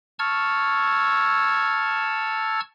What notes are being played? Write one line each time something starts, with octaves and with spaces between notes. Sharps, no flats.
A5 C#6 E6 F6 G#6